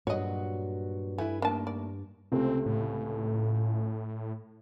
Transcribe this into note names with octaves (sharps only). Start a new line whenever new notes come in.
G2 A#2 F#3 F#4 C#5 D#5
A3 E4 B4 G#5
A3 A#3 D4 D#4 A5
D5
C#2 C3 A3 C4
A2